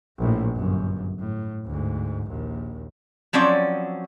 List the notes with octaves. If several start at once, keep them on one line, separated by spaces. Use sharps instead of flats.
A#1 A2
G1 F#2
A2
D2 G#2
A#1 D#2
F3 F#3 C4 C#4 D5